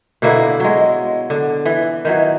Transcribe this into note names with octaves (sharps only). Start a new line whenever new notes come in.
B2 D3 A#3 E4
F#3 G#3
D3
E3
D#3 E3 F#3